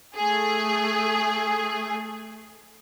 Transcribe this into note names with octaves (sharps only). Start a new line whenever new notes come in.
A3 G#4